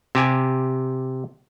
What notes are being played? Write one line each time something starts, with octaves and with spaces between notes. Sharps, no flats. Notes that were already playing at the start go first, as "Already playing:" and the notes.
C3 G4 G#5